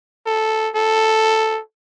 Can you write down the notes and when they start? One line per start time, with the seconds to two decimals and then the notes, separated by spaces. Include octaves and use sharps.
0.27 A4
0.75 A4